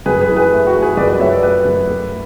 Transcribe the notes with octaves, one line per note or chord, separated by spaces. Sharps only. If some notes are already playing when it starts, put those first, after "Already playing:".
F#2 G#4 B4
G#4 B4
E3
G#4 B4
A3
F#4
E3
G#4 B4
F#2 B4 D5
B4 D5
F#2 C#5 E5
B4 D5
A3 B4 D5
F#2
A3